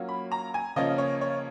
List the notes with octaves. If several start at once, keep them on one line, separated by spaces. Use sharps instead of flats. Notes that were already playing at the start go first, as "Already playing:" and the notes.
Already playing: F#3 A#3 C#4 F4
B5
A#5
G#5
C#3 F3 A#3 C#4 F4 D#5
C#5
C#5